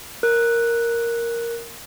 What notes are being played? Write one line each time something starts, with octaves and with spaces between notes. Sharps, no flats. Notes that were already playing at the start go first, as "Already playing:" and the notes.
A#4 F#6